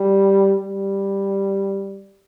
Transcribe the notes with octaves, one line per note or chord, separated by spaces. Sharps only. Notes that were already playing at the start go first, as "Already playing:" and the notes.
Already playing: G3
G3